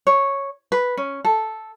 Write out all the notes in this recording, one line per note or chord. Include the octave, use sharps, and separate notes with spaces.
C#5
B4
C#4
A4